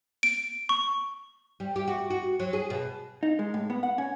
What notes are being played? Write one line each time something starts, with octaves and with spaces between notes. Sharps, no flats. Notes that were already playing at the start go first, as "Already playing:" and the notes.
D7
C#6
G3
G4
F#4
F#4
F#3
G#4
B2
D#4
G#3
A2
B3
F#5
C#4